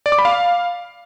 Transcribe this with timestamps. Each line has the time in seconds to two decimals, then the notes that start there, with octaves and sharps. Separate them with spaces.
0.06 D5
0.12 D6
0.19 B5
0.25 F5